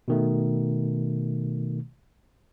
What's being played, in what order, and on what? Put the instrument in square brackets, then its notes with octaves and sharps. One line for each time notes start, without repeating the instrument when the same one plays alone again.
[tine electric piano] B2 D#3 A3